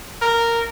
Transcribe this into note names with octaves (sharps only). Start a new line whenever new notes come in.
A#4